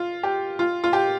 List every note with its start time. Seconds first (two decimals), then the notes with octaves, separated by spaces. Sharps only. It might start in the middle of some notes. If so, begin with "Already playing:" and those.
Already playing: F4
0.23 G4
0.59 F4
0.84 F4
0.93 G4